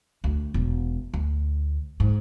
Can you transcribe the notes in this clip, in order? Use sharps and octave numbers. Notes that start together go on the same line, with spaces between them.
D2
E1
D2
G#2